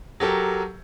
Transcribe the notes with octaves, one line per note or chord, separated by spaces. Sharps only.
F#3 G4 A4 A#4